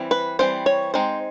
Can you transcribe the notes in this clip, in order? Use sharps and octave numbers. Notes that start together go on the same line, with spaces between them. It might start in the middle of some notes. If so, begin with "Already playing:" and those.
Already playing: E3 G3 C4
B4
E3 G3 C4 C5
C#5
G#3 C4 D#4 C5